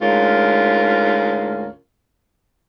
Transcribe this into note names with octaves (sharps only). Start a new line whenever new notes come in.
D2 G#2 C#4 F4 A#4